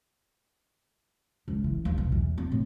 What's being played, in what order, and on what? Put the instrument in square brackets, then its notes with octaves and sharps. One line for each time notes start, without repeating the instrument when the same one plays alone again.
[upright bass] C#2
E3
D#2
B1
E2
C4
A2